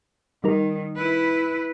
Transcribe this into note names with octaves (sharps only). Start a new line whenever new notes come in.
D#3 G3 D#4 A#4
E4 B4